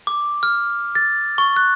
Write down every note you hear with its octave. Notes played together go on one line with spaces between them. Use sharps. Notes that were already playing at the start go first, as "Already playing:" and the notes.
D6
F6
A6
C#6
F#6